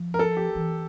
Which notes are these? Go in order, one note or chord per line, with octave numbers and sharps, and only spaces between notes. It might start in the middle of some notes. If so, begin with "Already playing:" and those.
Already playing: F3
A#4
A4
G4
E3